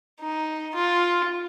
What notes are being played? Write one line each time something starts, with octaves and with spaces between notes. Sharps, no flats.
D#4
F4